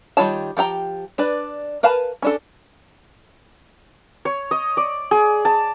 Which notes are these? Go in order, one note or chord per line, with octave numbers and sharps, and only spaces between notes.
D#3 G3 F4 C#5 A5
F3 G4 G5 A#5
D4 B4 D5
A#4 B4 F5 G#5 A5
C#4 D4 A4
C#5
D#5
D5
G#4
A5